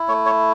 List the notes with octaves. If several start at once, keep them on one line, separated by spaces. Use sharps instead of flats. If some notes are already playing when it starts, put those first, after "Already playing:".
Already playing: E4
A3 C#5
C#5